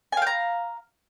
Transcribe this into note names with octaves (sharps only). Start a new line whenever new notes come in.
F5 G5 G#5 A#5